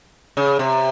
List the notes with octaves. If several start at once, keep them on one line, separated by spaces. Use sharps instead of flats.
C#3
C3